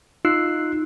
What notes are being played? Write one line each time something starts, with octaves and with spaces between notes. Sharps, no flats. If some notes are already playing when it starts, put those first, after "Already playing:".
D#4 F4 E6 F#6 C7